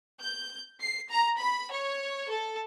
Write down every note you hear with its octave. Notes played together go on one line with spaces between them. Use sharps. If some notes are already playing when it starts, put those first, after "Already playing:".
G6
C7
A#5
B5
C#5
A4